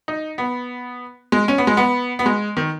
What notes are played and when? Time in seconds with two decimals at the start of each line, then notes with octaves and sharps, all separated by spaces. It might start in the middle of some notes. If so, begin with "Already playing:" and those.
0.08 D#4
0.38 B3
1.32 G#3
1.48 C#4
1.58 B3
1.67 G#3
1.77 B3
2.19 B3
2.26 G#3
2.57 D#3